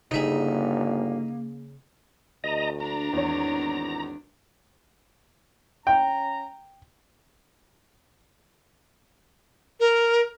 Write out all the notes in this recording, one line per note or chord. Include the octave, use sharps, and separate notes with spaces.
G1 C#3 A#3 D#4 G#4 E5
D2 D#5 A#5
D4 A#5
G#1 E2 C#5
C#4 G5 A#5
A#4